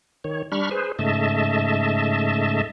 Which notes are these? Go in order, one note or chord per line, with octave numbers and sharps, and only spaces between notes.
D#3 C#5
G3 D4 B5 C#6 F6
G#4 B4 C5
G#2 C#3 A3 D#5 E5 A5